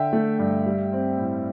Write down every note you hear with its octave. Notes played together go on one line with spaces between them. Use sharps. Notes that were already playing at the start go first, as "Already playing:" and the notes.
Already playing: D3 E5 G5
A3
G2
G3
C4
A2